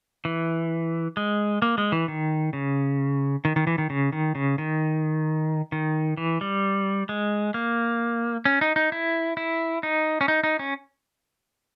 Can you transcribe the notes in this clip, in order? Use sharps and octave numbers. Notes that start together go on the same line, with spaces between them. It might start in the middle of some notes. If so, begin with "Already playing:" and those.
E3
G#3
A#3
G#3
E3
D#3
C#3
D#3
D#3
E3
D#3
C#3
D#3
C#3
D#3
D#3
E3
G3
G#3
A#3
C#4
D#4
D#4
E4
E4
D#4
C#4
D#4
D#4
C#4